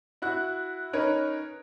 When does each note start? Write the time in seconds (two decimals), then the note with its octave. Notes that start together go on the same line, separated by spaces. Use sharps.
0.22 E4 F#4 F#6
0.93 C#4 D#4 A#4 B4 C#5